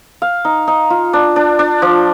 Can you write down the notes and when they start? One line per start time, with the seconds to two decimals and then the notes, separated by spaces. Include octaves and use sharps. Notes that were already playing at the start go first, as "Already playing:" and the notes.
0.22 F5
0.45 D#4
0.68 D#4
0.90 F4
1.13 D4
1.36 D4
1.59 D4
1.82 F3